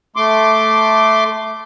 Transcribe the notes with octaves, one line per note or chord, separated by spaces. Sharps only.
A3 C6 D6